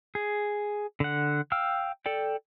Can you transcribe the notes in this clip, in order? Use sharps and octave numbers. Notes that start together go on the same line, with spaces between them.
G#4
D3 F#5
F5 G5 E6 F6
A4 D5 G5